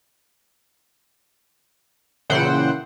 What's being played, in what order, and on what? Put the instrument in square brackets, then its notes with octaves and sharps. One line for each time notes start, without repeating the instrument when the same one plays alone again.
[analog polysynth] A#2 C#3 E3 C5 F#5 G5